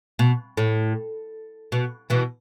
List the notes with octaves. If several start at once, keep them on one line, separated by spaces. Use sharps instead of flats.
B2
A2
B2
B2 E3